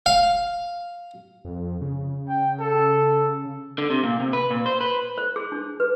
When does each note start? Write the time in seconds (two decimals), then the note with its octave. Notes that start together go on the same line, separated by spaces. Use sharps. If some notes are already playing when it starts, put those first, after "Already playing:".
0.06 F5
1.45 F2
1.81 C#3
2.28 G5
2.60 A4
3.78 D3
3.90 C3
4.03 A#2
4.20 C3
4.33 B4
4.51 A#2
4.66 C5
4.81 B4
5.18 C5
5.36 G#4
5.52 D4
5.80 B4